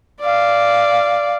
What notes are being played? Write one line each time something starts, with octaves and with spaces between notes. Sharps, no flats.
D5 F5